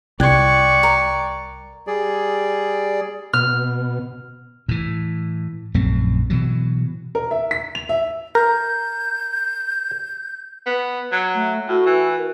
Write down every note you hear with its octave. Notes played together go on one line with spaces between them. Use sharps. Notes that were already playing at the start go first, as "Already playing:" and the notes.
C2 D5 G5 C#6 F#6 G#6
A#4
G3 G#4 D5
B2 F6
A2 E3
A#1 F#2 A3 C4
B2 E3 F#3
A#4
E5
B6
F7
E5
A#4 G6
B3
F#3
A3
A2 F#4
E3
A#4